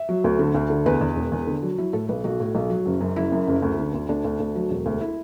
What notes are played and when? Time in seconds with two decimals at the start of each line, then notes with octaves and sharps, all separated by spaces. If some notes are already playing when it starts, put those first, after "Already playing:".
Already playing: E5
0.09 F#3
0.24 D2
0.39 D3
0.55 D2
0.70 D3
0.86 E2 B4
1.01 E2
1.16 E1
1.32 E2
1.47 D3
1.62 F#3
1.78 F#3 E4
1.93 A2 A4
2.09 B1 B4
2.24 B1 F#4
2.40 A2
2.55 B1
2.70 F#3
2.86 F#1
3.01 F#2
3.16 F#1 E4
3.32 F#2
3.47 F#1
3.62 D2
3.78 D3
3.94 D2
4.09 D2 D4
4.24 D2
4.40 D2
4.55 F#3
4.71 E1
4.86 D2
5.01 E4